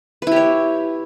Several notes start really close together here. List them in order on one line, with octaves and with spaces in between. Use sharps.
B4 E4 G4 C#5